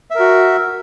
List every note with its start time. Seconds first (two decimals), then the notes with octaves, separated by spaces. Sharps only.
0.11 E5
0.15 A#4
0.19 F#4